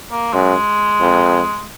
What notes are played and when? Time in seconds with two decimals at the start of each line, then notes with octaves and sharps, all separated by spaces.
0.11 A#3
0.33 F#2 G#3
1.01 F2